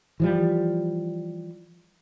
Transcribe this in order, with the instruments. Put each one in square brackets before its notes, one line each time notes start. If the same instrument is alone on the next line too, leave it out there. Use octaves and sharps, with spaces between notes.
[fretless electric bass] E3 F3 G3